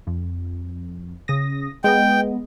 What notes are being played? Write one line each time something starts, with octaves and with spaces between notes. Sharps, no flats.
F2
C#3 D#6 A#6
G#3 B3 D#5 G5